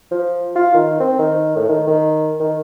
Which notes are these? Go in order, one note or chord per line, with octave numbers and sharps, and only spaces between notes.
F3
F4
D#3
C4
D#3
A2
D#3
D#3
D#3